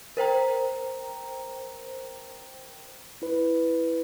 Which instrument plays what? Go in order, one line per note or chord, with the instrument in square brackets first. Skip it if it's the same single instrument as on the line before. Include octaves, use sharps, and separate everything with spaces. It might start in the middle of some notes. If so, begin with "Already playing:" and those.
[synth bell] A#4 C5 G5 A#5
[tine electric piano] E4 B4